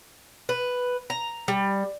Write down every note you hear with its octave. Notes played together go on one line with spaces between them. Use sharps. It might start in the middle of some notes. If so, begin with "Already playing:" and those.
B4
A#5
G3